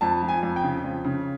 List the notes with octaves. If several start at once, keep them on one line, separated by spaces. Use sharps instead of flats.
F2 A5
F3
G#5
F2
G5
C#3
F2
C#3